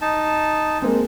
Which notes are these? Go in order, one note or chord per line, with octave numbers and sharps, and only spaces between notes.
D#4 A5
G#3 A#3 C4